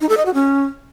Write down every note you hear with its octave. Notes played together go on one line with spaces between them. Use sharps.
D#4
A4
D#5
F#4
C#4